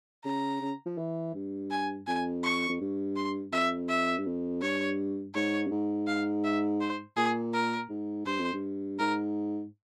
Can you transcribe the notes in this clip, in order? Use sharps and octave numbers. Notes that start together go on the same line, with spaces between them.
C#3 A#5
C#3
F3
E3
G2
G#5
F2 G#5
C#6
F2
G2
C6
F2 E5
E5
G2
F2
G2 C#5
G#2 C#5
G2
G#2
F5
E5
C5
A#2 G#4
A#4
G#2
G2 C5
F2
G2
G#2 A#4